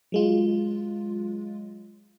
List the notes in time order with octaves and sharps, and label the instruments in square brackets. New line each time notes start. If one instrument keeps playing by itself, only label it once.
[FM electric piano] F#3 G#3 F4